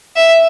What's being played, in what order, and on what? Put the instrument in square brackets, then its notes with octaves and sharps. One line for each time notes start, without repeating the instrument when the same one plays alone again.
[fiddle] E5